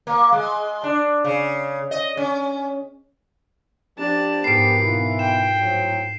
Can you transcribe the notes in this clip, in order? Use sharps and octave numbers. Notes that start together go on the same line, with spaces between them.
A#3
G#3
D4
C#3
D#5
C#4
F3 D4 G4 A5
G#2 B3 A#4 B5 C7 D7
B2 E3 F4 F#5
G5 E7
A2 F3 F#3